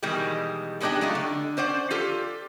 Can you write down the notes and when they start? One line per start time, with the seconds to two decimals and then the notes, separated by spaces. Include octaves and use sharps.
0.03 B2 D#3 E3 G3 G#3
0.80 G3 G#3 B3 D4 D#4 G4
1.01 F#3 A3 D#4 F4
1.15 D3
1.57 C#4 C5 D5 F#5
1.91 F4 G4 A4